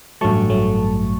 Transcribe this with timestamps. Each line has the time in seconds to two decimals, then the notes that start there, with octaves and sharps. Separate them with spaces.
0.21 A1 G2 F#3 A3 A5 C#6
0.50 F#3 A3